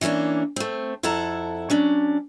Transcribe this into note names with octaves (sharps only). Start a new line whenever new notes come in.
E3 G3 A#3 C#4 D4
A3 C4
F2 E4 A4 F#5 A5 A#5
F#3 C#4 D4